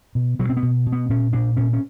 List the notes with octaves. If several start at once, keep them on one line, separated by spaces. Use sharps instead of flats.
B2
B2 F#3
C4
B3
B2
B2
B3
A#2 C#4
A#2 D4
A#2 C#4
C#4